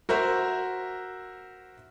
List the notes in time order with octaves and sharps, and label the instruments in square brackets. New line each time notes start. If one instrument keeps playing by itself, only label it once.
[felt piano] F#4 A#4 C5 E5